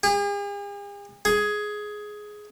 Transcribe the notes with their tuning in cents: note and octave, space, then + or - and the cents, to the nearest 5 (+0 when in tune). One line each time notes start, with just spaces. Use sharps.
G#4 -45
G#4 +10